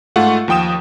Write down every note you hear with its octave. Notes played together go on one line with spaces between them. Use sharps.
G#2 A3 F4 F#5 C#6
D#2 F3 G5 D#6 E7